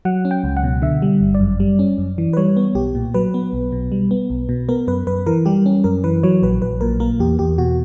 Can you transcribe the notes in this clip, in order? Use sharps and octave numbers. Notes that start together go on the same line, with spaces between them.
F#3 F#5
C#4
G5
C#2
F#5
B2
D3 E5
G3
G1
D5
F#2
G3
C#4
F#2
E3
B4
G3 C#5
B3
B1 G4
A#2
F#3 B4
B3
B1
B2
G3
B3
B1
B2
B3 A#4
F#2 B4
F#2 B4
E3 A#4
G3 G4
C#4
F#2 A#4
E3 B4
F#3 C#5
A#1 B4
A#1 B4
A#2 A#4
A#3 A#4
E2 G4
E2 G4
B2 F#4